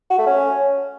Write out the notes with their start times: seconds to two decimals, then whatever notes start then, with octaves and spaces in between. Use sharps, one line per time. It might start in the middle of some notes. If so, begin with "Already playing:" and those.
0.10 F#4
0.18 A3
0.26 C#4